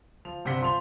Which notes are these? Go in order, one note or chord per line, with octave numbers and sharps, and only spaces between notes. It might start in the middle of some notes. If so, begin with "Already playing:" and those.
F3 F7
G2 C3 C5 F#5 B6 G7
F3 C6 F7